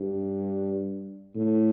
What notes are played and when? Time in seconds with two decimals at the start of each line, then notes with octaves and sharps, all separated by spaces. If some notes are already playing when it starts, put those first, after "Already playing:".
Already playing: G2
1.35 A2